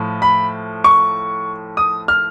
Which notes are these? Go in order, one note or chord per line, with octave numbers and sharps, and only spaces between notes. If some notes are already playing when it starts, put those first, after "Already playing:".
Already playing: A2 F3
B5
C#6
D#6
F6